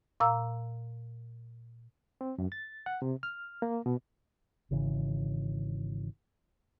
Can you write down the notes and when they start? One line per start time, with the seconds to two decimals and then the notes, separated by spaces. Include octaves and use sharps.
0.20 A#2 F5 A#5 E6
2.21 C4
2.38 F#2
2.52 A6
2.86 F#5
3.02 C3
3.23 F6
3.62 A#3
3.86 B2
4.71 G#1 C#3 E3